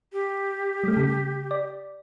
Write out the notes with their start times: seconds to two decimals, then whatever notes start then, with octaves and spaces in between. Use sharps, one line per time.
0.12 G4
0.84 G3 A3
0.97 C#3
1.51 D5